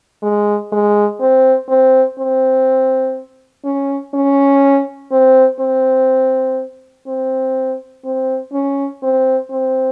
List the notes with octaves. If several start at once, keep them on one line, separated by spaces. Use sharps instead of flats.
G#3
G#3
C4
C4
C4
C#4
C#4
C4
C4
C4
C4
C#4
C4
C4